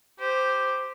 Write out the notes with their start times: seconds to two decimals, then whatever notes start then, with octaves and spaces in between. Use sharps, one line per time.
0.20 G4 C5